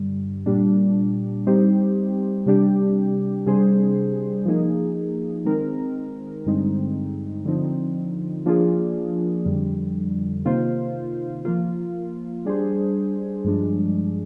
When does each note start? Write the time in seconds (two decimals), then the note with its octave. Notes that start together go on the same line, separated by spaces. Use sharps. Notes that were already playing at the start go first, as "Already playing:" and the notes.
Already playing: G2 D3 G3
0.46 A#2 G3 D4
1.47 G3 C4 D#4 G4 C5
2.46 C3 G3 D4 G4
3.46 C3 G3 D4 G#4 C5
4.45 F3 A#3 D#4 G#4
5.45 D#3 G#3 C4 D#4 A#4
6.46 G2 D3 G#3 C4 D#4
7.46 D3 F3 C4 D#4
8.46 F3 A#3 D4 F4 G#4
9.45 F2 D3 G3
10.45 C3 D#3 A#3 F4 C5
11.45 F3 A#3 F4
12.45 G3 D4 G#4 C5
13.45 G2 F3 G#3 D4